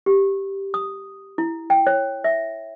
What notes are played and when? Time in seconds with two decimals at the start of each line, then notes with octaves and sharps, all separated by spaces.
0.06 G4
0.74 D#6
1.38 E4
1.70 G5
1.87 C#5
2.24 E5